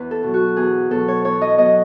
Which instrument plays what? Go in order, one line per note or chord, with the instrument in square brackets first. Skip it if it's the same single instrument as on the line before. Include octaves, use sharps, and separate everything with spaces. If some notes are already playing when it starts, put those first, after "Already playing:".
Already playing: [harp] E2 B4
A4
B2 F#3
F#4
E2 G#4
B2 F#3 A4
C#5
E2 C#5
D#5
B2 F#3 D#5